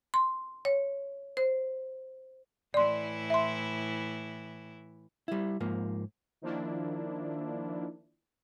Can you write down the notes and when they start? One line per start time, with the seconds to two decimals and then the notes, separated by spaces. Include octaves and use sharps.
0.14 C6
0.65 C#5
1.37 C5
2.74 A2 E3 E4 D5 C6
3.30 E5 C6
5.28 G3 E4
5.60 G#2 F3 A#3
6.42 D#3 F3 A#3 D4 E4